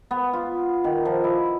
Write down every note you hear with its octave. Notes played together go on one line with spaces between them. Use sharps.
B3
F4
D#3
F3
E4